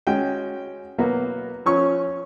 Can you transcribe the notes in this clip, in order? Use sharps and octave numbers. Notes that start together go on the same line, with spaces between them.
G#3 C#4 F#4 G5
B2 F#3 A#3 B3 F#4
F3 C#4 C#5 C#6